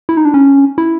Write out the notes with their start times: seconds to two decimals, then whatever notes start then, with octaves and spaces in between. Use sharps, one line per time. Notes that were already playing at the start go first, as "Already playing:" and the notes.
0.09 E4
0.17 D#4
0.25 D4
0.34 C#4
0.78 E4